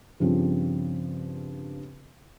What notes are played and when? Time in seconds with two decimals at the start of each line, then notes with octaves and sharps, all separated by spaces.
0.20 G2 C#3 F3 C4